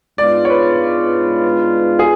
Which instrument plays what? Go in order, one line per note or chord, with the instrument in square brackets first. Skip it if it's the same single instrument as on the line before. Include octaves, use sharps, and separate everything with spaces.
[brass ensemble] G#2 G#3 B3 D4 F4 [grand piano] D5
[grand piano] C#5
B4
G#4